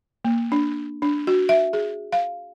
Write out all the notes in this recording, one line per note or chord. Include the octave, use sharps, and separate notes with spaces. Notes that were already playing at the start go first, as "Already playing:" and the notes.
A#3
D4
D4
F#4
E5
G#4
F5